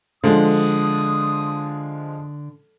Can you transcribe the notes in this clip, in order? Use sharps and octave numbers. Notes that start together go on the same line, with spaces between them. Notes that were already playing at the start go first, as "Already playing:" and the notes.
D3 F3 G#3 D#6